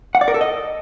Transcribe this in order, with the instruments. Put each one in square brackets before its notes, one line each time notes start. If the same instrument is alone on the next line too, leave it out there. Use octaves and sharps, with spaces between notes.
[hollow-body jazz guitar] F#5
D5
A#4
A4
D#5